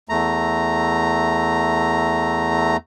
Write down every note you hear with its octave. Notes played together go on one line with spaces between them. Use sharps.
E2 A3 A#5